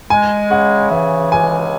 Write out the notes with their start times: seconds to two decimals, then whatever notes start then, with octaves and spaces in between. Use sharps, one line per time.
0.10 G#3 G#5
0.51 C#3 F#5
0.91 E3 E5
1.32 C#2 G#5